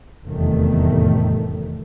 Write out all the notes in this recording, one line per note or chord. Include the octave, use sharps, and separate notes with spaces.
F1 E2 A2 D#3 G3 A3